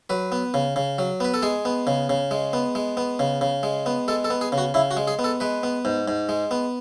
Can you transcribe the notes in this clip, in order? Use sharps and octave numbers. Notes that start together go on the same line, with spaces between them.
F#3 B4
B3
C#3
C#3
F#3
B3 B4
A4
G#3 G#4
B3
C#3
C#3
G#3
B3
G#3
B3
C#3
C#3
G#3
B3
G#3 A4
A4
B3
G#4
C#3
F#4
C#3 E4
F#4
G#3
G#4
B3
A4
G#3 B4
B3
G#2
G#2
G#3
B3